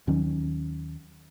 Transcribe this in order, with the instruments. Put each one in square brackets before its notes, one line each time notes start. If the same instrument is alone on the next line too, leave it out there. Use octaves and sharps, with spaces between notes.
[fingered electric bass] D#2 D#3 F#3 C#4